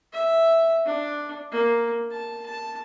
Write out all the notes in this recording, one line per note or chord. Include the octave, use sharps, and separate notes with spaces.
E5
D4
A#3
A5
A5